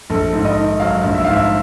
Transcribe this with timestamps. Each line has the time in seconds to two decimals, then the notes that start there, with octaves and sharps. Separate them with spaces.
0.10 A#1 A4
0.33 G#2
0.45 D#5
0.57 D#3
0.79 F#3 F5
1.04 A#1
1.14 E5
1.24 G#2 F5
1.33 E5